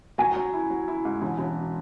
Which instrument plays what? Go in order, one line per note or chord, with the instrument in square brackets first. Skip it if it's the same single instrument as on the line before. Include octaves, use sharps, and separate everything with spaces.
[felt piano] F#3 [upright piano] G#5
[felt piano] F#3
E4
F#3
E4
G#2
E1
E1